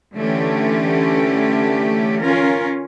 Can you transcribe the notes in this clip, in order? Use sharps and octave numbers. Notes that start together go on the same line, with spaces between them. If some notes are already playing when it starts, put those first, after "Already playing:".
D3 E3 A3 C#4 G4
C#4 F4 A#4